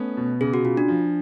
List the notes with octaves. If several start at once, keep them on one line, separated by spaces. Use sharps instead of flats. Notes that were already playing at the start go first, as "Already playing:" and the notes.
Already playing: A3 B3 C#4 A4
B2
C#3 G#4
F#4
C#3 F4
D4
F3